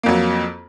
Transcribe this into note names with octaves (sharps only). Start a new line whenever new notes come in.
F2 F#3 A#3